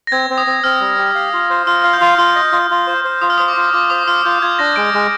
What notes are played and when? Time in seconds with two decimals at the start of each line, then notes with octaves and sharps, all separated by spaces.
0.07 A#6
0.12 C4 G#6
0.30 C4
0.38 D#6
0.47 C4
0.64 C4 F6
0.80 G3
0.99 G4
1.15 F5
1.33 F4
1.50 C5
1.67 F4 F6
1.82 F5 F6
1.93 G6
2.01 F4
2.18 F4 F6
2.36 D#5
2.52 F4
2.71 F4
2.87 C5
3.04 C5
3.22 F4 D#6
3.30 F6
3.38 C5 D#6
3.48 D6
3.57 F4
3.74 F4 D6
3.90 C5 D#6
4.07 F4 F6
4.25 F4 G6
4.42 F4 G#6
4.59 D4 A#6
4.76 G#3 D7
4.94 G#3